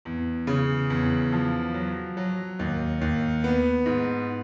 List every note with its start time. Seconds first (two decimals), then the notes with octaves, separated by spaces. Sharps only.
0.05 E2
0.47 C#3
0.90 E2
1.32 F3
1.74 F#3
2.17 F#3
2.59 D#2
3.01 D#2
3.44 B3
3.86 G#2